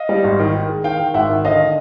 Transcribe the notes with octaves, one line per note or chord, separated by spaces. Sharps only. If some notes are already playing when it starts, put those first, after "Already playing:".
Already playing: D#5 F5
G3
G#1
D#3
D#3
G#3
D#3 F5 G5
D#3
G#1 E5 F#5
D#3
D3 D#5 F5
D3